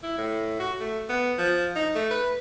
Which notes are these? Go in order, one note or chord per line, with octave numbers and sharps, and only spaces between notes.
E4
A2
F#4
A3
B3
F3
D#4
A3
B4